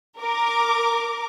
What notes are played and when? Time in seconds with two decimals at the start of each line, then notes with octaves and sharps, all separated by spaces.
0.20 A#4 D6